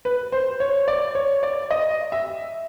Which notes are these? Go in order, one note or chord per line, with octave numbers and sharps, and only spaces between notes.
B4
C5
C#5
D5
C#5
D5
D#5
E5